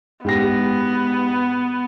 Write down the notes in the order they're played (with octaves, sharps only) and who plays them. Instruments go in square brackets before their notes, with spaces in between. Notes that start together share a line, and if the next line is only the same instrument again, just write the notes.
[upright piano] G#2 G4 A#6 [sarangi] B3